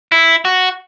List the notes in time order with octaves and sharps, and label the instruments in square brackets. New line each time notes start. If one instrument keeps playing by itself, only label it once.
[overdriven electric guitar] E4
F#4